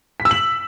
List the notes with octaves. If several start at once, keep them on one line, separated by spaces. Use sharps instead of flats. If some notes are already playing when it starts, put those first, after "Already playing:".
B6
E6
F#7